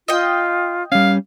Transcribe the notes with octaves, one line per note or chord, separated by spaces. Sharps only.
F4 D#5 G5
G3 C#4 F5